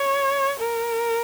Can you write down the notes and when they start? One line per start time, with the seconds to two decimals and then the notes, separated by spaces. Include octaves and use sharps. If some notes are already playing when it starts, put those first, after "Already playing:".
Already playing: C#5
0.60 A#4